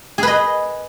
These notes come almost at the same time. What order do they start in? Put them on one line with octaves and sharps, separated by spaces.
G#4 B4 D#5